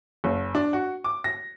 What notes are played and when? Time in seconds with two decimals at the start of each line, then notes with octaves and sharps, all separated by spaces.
0.24 F#1
0.55 D4
0.73 F#4
1.04 D6
1.24 A#6